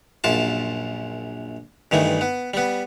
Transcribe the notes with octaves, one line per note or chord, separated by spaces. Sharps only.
A#1 F#2 F4 A5
G2 D#3 E3 A3
B3
G3 B3